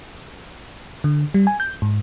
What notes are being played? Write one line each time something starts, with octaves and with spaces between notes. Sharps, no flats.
D3
G3
G#5
G6
G#2